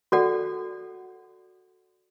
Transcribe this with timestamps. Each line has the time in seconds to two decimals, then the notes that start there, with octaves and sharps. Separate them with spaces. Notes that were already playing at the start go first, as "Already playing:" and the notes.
0.12 F#4 A4 D5 F#5